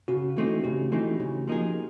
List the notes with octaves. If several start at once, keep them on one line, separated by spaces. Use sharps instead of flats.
C#3 F#4
E3 A3 C4 D#4
C#3 G4
E3 A3 C4 D#4
C#3
F3 A#3 D#4 G#4